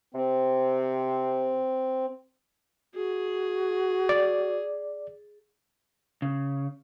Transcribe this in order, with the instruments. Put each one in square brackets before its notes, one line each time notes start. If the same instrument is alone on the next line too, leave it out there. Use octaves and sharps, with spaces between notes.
[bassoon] C3 [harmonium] C4
[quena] F#4 [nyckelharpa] G#4
[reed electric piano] D5
[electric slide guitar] C#3